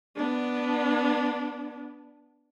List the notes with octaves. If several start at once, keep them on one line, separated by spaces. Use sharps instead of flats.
B3 D4